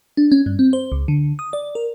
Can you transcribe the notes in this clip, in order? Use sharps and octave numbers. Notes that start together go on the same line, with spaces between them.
D4
C#4
G2
C4
C5
C#2
D3
D#6
D5
A#4